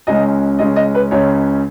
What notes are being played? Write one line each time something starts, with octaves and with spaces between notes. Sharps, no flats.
C#2 C#3 G#3 C#4 D#5
C#2 C#3 G#3 C#4 D#5
D#5
B4
C#2 C#3 G#3 C#4 C#5